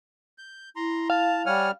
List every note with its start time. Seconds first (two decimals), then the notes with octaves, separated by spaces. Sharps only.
0.38 G6
0.76 E4 A#5 C6
1.10 F5 A5
1.46 G3 C#5 F#5 G#5 F6